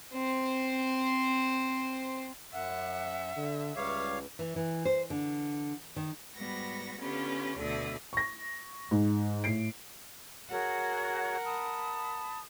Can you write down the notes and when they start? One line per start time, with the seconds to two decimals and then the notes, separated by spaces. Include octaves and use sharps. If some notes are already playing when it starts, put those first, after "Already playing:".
0.14 C4 C5
2.53 F#2 E5 F#5
3.36 D3
3.76 C#2 G3 B4 C#5 F5 D6
4.39 E3
4.56 E3
4.85 C5
5.10 D3
5.96 D#3
6.36 G#2 G3 B3 F#4 A#6
7.01 D3 B3 C#4 F4 G4 B4
7.58 D2 B2 D3 D5 E5 D#6
8.13 C#6 A#6
8.91 G#2
9.44 A2 C7 D7
10.50 F#4 G#4 A#4 C#5 F#5
11.44 A5 B5 D#6